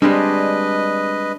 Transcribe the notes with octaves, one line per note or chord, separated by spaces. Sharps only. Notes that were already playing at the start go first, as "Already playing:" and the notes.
G3 G#3 C4 D4 B4 D#5